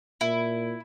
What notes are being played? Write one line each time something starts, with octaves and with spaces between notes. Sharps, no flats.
A#2 E4